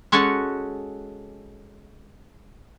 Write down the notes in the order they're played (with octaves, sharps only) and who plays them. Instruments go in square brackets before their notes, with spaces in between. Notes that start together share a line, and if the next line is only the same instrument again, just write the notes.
[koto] G#3 C#4 F#4 A4 C#5 A5